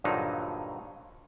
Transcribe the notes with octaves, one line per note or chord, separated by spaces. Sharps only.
G2 A#2 D3 F3 F#3 D#4